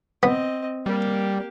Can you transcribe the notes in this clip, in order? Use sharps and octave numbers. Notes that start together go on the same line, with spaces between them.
B3 C4 D#5
G3 A#3 G4